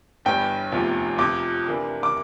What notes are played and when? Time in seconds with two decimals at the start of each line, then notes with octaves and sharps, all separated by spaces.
0.25 G1 G2 E3 G3 G5
0.72 F1 E2 C3 F3
1.18 F2 C3 F3 D6
1.66 C3 E3 A#3 D4
2.03 D6